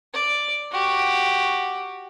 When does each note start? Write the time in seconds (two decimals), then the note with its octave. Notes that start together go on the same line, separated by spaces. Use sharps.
0.14 D5
0.72 F#4 G4